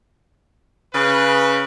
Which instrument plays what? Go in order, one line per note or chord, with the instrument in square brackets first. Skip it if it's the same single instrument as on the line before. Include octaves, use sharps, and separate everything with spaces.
[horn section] C#3 B4